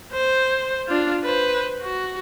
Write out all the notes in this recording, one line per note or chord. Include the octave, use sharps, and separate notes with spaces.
C5
D4 F4
B4 C5
F#4